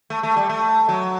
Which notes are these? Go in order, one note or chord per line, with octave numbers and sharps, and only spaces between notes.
A3
A3
G3
A3
F#3